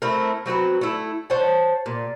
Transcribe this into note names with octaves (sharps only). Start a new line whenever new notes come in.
A3 C4 E4 A#4
F#3 C4 F#4 B4
A3 E4
C5 C#5 F#5 A5
A#2